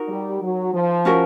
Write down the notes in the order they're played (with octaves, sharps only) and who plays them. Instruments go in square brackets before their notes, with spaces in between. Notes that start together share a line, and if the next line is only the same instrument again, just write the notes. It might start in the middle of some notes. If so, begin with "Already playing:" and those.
Already playing: [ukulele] D#4 F#4 A#4
[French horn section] G3
F#3
F3
[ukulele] C#4 F#4 A#4